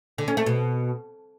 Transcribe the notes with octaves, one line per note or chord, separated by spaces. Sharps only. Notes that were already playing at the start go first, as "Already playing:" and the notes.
D3
C#4
A3
B2